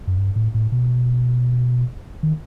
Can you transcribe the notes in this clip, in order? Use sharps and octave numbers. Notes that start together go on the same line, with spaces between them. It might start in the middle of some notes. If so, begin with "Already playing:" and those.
F#2
G2
A2
A2
B2
D#3